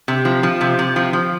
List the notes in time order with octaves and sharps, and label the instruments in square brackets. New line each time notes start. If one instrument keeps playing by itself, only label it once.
[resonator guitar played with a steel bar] C3
F3
F3
C3
C3
F3
F3